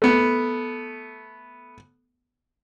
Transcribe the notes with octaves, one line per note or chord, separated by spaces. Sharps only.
A3 B3